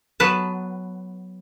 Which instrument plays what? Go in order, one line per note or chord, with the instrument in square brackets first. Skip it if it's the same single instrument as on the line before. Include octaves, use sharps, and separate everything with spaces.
[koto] F#3 B3 B4 A5